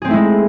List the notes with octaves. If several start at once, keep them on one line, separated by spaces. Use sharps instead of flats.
G#3 A3 C4 E4 G#4